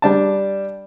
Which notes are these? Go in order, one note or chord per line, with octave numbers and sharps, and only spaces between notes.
G3 D4 A5